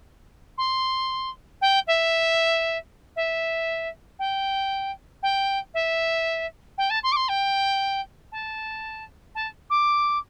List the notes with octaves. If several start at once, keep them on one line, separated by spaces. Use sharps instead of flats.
C6
G5
E5
E5
G5
G5
E5
G5
A5
C6
D6
C6
G5
A5
A5
D6